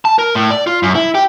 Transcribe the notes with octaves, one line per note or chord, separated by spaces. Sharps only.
A5
A#4
A2
D5
F4
F#2
E4
G4